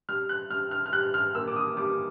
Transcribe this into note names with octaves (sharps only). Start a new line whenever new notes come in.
G3 F6
F#6
G3 F6
F6
F6
G3 F#6
F6
A#3 E6
D6
D#6
G3 D6